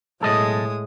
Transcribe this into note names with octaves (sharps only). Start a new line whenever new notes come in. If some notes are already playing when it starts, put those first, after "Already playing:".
B1 A2 G#3 A4 D#5 D#6